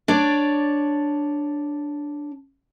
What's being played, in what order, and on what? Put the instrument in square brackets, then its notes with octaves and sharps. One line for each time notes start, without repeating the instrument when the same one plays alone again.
[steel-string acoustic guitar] D4 C#5 D5